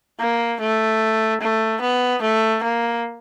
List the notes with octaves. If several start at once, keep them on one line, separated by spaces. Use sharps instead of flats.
A#3
A3
A3
B3
A3
A#3